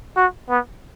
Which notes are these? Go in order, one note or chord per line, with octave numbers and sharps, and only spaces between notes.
F#4
B3